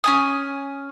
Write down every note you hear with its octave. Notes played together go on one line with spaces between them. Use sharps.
C#4 G#5 D#6